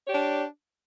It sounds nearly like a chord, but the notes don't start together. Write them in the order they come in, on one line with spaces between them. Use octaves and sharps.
C#5 G4 D5 D4